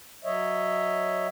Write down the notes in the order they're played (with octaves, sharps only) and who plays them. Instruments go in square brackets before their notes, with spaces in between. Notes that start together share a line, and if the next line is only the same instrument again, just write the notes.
[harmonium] F#3 C#5 D#5 E5